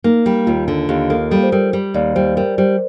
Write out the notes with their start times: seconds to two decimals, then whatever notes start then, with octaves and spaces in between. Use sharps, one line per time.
0.04 A#3 D#4
0.26 G3
0.47 D#2 F4
0.68 D3
0.89 D#2 G4
1.10 A#3 A4
1.31 G3 A4
1.43 C5
1.52 G3 A#4
1.73 G3
1.94 D#2 D5
2.16 G3 C5
2.36 G3 A#4
2.58 G3 C5